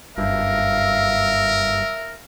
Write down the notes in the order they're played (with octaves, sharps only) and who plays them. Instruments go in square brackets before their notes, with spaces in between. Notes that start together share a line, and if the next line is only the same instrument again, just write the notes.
[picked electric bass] F#1 G2 [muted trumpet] A#4 [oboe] E5 [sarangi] F5